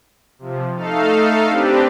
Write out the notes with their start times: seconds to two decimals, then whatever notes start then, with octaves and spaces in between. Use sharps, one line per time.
0.39 C3 F3
0.77 A3 D#4 A4 F5
1.49 C4 D4 G4 B4